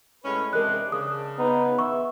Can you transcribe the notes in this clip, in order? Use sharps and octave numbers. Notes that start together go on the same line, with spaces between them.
A2 G#3 C#4 B4
C3 G#3 D4 A#4 F#6
C#3 D#6
B3 D#4
E5 C#6